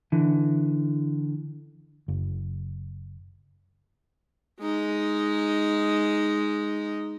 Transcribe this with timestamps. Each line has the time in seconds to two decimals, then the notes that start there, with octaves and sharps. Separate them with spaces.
0.12 D3 E3
2.08 F#1
4.60 G#3 D#4